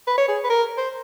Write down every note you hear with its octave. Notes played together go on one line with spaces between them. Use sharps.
B4
C#5
G#4
B4
A#4
C5